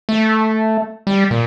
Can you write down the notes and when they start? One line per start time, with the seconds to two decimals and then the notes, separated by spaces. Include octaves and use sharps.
0.09 A3
1.07 G3
1.31 A#2